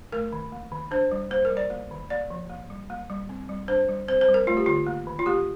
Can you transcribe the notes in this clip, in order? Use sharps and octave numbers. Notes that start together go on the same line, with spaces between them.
A3 A#4
D#3
A#3
D#3
D4 C5
G3
A#3 C5
A#4
G3
D5
A#3
D#3
A#3 D5
F3
A#3
G3
A#3
G3
C4
G3
D4 C5
G3
C4 C5
C5
G3
A#4
A3 F4
G4
D3 F4
A#3
D#3
F4
A#3 G4